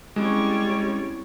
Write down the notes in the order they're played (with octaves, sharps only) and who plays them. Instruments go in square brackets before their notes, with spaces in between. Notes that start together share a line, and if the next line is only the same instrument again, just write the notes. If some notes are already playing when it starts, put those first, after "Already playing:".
[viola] G3 C#5 [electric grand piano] G#3 [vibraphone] C4 C#4 E4